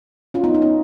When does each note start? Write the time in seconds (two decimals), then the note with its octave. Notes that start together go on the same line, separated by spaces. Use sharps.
0.34 C#4 F4
0.44 B3 D#4
0.54 D#4
0.62 C#4